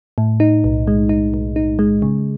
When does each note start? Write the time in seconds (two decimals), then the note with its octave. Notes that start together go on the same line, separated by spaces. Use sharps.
0.18 A2
0.40 D#4
0.64 B1
0.87 G#3
1.09 D#4
1.34 B1
1.56 D#4
1.79 G#3
2.02 C#3